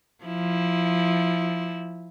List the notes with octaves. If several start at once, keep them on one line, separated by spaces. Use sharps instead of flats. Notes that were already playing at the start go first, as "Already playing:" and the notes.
F3 E4